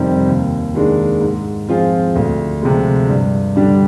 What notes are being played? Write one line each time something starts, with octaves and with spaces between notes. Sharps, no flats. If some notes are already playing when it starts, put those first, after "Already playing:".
Already playing: F2 C3 D#3 G3 C4
D#2
D#3 G#3 D4
G#2
F3 C4 F4 G#4
D2
C3 F3 G#3
G2
D3 G3 D4